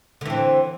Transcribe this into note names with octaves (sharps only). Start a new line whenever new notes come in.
D3 E3 C4